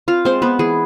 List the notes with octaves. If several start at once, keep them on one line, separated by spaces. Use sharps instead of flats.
C4 F4 F5
G#3 C4 C5
B3 C4 B4
E3 G#4